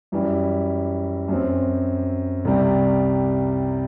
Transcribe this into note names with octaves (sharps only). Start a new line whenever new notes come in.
F#2 E3 G3
F#2 F#3 C4
C2 C3 G3